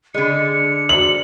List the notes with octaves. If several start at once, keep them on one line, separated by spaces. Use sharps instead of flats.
D3 G#3 G#4 D5 C#7
F#4 C5 D5 F#7